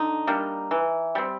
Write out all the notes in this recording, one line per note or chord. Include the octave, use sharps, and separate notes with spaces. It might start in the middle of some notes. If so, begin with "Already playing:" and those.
Already playing: D3 D#4
G3 A#3 D4
E3
G3 C4